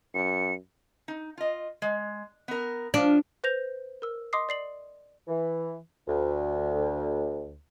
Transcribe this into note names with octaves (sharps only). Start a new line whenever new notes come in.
F#2 C#7
D#4
F4 D#5
G#3
B3 A#4
F3 D4 F4
B4 C5 G6 A#6 F7
A#4 E6
D#5 C6 D6 D#6 C7
D5 C7 F#7
E3
D2